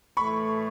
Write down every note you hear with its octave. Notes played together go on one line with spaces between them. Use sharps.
A2 E3 A3 B5 C#6